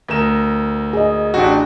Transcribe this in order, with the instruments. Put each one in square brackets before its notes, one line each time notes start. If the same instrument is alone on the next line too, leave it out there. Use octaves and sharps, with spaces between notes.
[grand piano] D2 A#4 E7
[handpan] G#4 D#5
[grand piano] A1 G4 [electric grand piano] D4 F#4